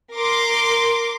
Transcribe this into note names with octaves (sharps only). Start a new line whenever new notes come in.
A#4 C6 D6